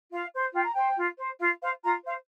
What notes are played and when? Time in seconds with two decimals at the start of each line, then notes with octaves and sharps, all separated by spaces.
0.11 F4 F5
0.33 C5
0.54 F4 G5
0.64 A#5
0.74 C5 G5
0.97 F4
1.18 C5
1.39 F4 F5
1.61 C5 F5
1.82 F4 A#5
2.04 C5 F5